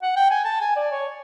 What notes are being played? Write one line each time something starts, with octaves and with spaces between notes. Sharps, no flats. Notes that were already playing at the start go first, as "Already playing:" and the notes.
F#5
G5
G#5
A5
G#5
D5
C#5